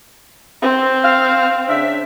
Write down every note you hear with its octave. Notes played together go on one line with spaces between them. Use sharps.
C4
F5
C#3 D4 E5